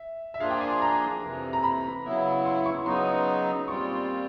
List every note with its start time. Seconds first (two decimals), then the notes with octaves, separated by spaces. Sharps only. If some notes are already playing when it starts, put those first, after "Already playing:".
Already playing: E5
0.34 E5
0.40 F3 A#3 D4 F4 G#4 F5
0.50 G5
0.61 G#5
0.82 A#5
1.22 F2 C3 E3
1.53 A#5
1.63 B5
2.05 C#3 F#3 B3 E4
2.45 C6
2.66 C#6
2.86 C#3 F#3 B3 D#4 C6
3.68 A#2 G3 C4 F4 C#6